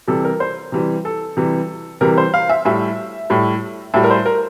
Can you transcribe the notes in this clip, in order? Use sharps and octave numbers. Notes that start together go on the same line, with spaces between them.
C3 E3 G3 A4
A#4
C5
C3 E3 G3
A4
C3 E3 G3
C3 E3 G3 A#4
C5
F5
E5
A2 G3 E5
A2 G3
A2 G3 E5
A#4
C5
A#4